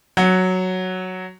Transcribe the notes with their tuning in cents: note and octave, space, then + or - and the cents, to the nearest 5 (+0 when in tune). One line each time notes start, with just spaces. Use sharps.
F#3 +0 F#5 +0